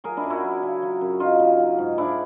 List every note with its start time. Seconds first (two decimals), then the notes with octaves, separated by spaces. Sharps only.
0.04 F#3 G#4 A#4
0.17 D4 E4
0.24 F#2
0.30 E4 F#4
0.44 F#2
0.62 C#3
0.82 F#3
1.01 F#2
1.20 F#2 D#4 F4
1.39 C#3
1.60 F#3
1.79 G#2
1.98 G#2 D4 E4